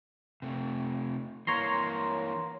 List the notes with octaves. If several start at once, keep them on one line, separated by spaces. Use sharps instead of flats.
C3 A3
E3 A#3 C#5 A#5 C6